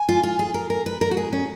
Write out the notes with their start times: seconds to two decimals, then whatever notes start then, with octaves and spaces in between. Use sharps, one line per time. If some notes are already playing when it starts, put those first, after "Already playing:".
Already playing: G#5
0.09 F4
0.23 F4
0.39 G#4
0.54 A#4
0.70 A#4
0.86 B4
1.01 A#4
1.11 F#4
1.17 G#4
1.33 C#4